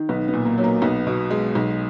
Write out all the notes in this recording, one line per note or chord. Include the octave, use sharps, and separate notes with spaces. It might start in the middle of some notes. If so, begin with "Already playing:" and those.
Already playing: D#3
B1 B3
B3
A#2
A#3
F#3
A#3
B1 B3
B2
G#3
B1